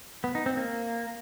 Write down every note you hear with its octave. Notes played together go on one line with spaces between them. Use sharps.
B3
D#4
C4
A#3